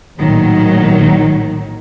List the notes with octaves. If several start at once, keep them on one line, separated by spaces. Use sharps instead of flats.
A#1 A2 D#3 F#3